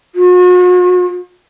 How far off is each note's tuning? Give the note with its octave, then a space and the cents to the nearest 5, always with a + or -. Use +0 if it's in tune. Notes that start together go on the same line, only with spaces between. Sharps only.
F#4 -45